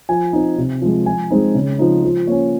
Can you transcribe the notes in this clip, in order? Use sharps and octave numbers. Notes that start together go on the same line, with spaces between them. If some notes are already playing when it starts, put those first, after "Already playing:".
F3 G#5
C4 D#4
C3
F3 G#3
F3 G#5
G#3 C4 D#4
C#3
F3 C4 D#4
F3
A#3 C#4 C#5